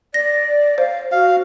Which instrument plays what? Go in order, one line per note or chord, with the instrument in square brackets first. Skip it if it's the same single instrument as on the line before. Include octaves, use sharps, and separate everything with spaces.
[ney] D5 [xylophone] A#6
[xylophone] C5 [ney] F5
[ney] F#4 [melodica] F5